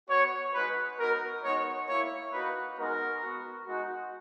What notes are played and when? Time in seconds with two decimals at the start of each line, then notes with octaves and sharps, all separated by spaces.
0.09 B3 F#4 C#5
0.54 G#3 D#4 F#4 B4
0.98 B3 D#4 F#4 A#4
1.43 G#3 B3 D#4 F#4 C#5
1.87 A#3 E4 C#5
2.32 A#3 D#4 F#4 B4
2.77 G#3 B3 D#4 F#4 A#4
3.22 B3 F#4
3.67 G#3 D#4 F#4